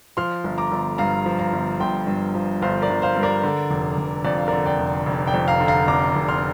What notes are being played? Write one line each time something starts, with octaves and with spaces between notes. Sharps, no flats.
F3 C6 F6
G1
A#5 D6
G1
G2 F5 A#5
F3
F5 A#5
G1
G1 G5 C6
G2
F3
G1 C5 F5
A#4 D5
G1
C5 F5
G2
A#4 D5
D3
F1
F1
F2 D5
F5
D3 A#4 D5
D5 G5
F1
F1
D5 G5
F2
F5 A#5
D3
F5 A#5
F1 A#5 D6
F1
C6 F6